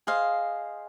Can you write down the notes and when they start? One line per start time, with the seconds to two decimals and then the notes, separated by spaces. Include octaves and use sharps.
0.07 G#4 C5 D#5 F5